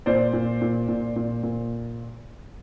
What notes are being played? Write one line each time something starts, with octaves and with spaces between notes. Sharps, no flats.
A#2 C5 D5
A#2
A#2
A#2
A#2
A#2